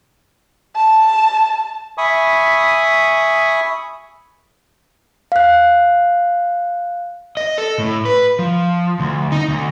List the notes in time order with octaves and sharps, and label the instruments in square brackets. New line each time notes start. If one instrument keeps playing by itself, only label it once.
[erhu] A5
[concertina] E5 G#5 B5 C#6 D#6
[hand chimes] F5 F#6
[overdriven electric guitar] D#5
A4
A2
B4
F3
D2
D#4
D2